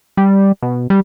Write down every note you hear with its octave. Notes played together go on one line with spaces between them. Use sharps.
G3
B2
G3